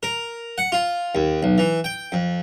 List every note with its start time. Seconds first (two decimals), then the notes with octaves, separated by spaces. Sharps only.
0.03 A#4
0.58 F#5
0.72 F4
1.15 D#2
1.43 B1
1.58 E3
1.84 G5
2.12 F2